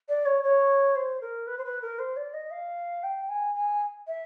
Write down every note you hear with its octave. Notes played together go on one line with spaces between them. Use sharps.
D5
C#5
C#5
C5
A#4
B4
C5
B4
A#4
C5
D5
D#5
F5
G5
G#5
G#5
E5